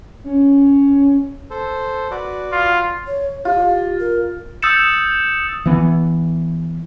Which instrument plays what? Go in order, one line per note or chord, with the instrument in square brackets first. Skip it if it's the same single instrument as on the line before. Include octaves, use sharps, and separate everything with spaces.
[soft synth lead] C#4
[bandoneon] A4 C5
F#4 B4 D5
[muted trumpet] F4
[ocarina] C#5
[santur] F4 [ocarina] G4
[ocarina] A#4
[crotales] D#6 E6 G6 A6 C#7 E7
[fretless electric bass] E3 B3